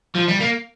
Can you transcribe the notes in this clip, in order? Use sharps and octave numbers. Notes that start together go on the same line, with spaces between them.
F3
G3
A#3